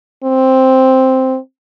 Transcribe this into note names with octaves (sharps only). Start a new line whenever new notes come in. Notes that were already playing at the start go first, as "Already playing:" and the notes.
C4